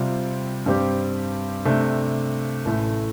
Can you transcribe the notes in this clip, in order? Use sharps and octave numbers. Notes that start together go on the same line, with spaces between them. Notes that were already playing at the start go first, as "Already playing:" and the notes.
Already playing: C3 G3 C4 F4
G2 G3 C4 G4
C3 A3 D4
A1 A2 A3